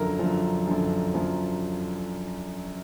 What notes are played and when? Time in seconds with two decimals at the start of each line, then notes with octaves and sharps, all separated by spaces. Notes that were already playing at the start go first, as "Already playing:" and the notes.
Already playing: F#2 D3 F3 A#4 A#5
0.19 F#2 D3 F3
0.68 F#2 D3 F3
1.14 F#2 D3 F3